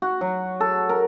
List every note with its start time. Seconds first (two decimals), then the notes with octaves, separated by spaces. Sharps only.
0.02 F#4
0.21 F#3
0.60 A4
0.89 A#4